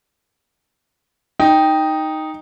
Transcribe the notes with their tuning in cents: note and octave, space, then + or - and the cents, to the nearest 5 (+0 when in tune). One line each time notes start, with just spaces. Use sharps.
D#4 +0 G5 +5